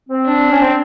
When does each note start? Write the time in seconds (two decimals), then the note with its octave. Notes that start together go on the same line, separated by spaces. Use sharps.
0.09 C4
0.26 D4
0.51 C#4
0.60 C4